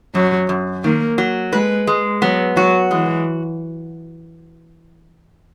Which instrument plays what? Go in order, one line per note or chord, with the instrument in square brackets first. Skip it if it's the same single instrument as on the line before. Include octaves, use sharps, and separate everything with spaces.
[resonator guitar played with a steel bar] F#2 [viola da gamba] F#3
[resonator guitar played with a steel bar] F#2
[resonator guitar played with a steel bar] D#3 [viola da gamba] A#3
[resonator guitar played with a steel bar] F#3
[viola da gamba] G#3 [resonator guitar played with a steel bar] B4
[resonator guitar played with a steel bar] G#3
[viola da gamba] F#3 [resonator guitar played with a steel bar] B3
[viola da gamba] F#3 [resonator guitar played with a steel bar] F#4
[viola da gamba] E3 [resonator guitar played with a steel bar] G#3